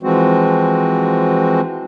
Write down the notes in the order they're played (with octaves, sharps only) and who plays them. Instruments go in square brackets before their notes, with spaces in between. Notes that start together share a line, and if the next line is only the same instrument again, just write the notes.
[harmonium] E3 F3 G#3 C4 F#4